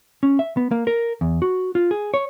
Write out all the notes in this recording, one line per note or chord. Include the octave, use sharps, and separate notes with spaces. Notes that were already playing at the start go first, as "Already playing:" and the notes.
C#4
E5
B3
A#3
A#4
E2
F#4
F4
G#4
C#5